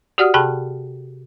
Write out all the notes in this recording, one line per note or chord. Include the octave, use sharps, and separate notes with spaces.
F#4 G4 D5 F#5 D#6 F6
C3 G#4 G5 A5 B5 F#6